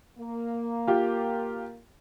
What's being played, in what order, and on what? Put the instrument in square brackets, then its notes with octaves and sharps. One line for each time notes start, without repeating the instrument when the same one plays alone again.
[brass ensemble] A#3
[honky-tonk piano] F4 G4